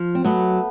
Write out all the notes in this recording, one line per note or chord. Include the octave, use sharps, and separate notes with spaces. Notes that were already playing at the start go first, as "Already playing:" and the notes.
Already playing: F3
C4
F#3 A3 B3